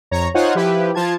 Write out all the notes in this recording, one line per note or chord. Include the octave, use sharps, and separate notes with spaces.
F2 C#5 A#5
D#4 F4 C5 C#5 F#5 G#5
F3 E4 G4 B4
F3 F4 A5 G#6